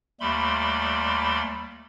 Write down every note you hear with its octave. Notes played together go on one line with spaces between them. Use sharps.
D#2 G3 A3 B5 C6